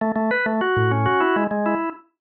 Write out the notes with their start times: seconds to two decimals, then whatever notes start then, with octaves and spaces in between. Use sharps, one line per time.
0.01 A3
0.16 A3
0.31 B4
0.46 A3
0.61 F#4
0.76 A2
0.91 C#4
1.06 F#4
1.21 E4
1.36 G#3
1.51 G#3
1.66 E4